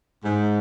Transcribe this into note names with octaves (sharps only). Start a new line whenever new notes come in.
G#2